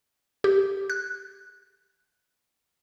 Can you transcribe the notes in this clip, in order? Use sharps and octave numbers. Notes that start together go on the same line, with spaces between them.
G4
F#6